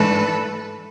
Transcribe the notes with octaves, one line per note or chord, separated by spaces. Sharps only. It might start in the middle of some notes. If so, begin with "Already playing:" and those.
Already playing: G#2 E3 A3 D4 A4 B4